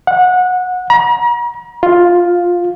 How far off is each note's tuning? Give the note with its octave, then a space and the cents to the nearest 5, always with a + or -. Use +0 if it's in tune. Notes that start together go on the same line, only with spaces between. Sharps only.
F#5 -20
A#5 +40
F4 +5